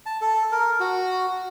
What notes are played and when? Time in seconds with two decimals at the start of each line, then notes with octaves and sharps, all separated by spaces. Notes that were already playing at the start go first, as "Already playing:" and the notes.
0.06 A5
0.21 A4
0.52 A#4
0.80 F#4